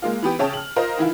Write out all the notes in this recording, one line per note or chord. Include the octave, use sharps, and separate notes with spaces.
G#3 A#3 F4
E3 B3 G4
C#3 C#5 E5 G5 A5
F6 F#7
F4 A#4 C5 D#5
D#3 E3 E4 F4